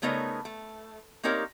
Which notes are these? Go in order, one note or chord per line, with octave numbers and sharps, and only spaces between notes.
C#3 A3 B3 D#4 A#4 C#5
A3
A#3 C4 D#4 G4 A#4 C#5